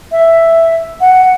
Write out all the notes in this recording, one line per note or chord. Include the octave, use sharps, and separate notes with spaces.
E5
F#5